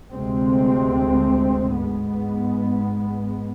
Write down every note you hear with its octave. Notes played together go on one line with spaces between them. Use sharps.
D2 C3 G#3 C4
G#2 G#3 B3